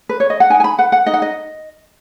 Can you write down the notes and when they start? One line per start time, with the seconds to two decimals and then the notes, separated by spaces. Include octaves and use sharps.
0.09 B4
0.20 C#5
0.30 D#5
0.40 F#5
0.50 D#4 G#5
0.60 G#5
0.64 B5
0.78 B4 F#5
0.92 F#5
1.06 D#4 D#5
1.14 F#5
1.22 D#5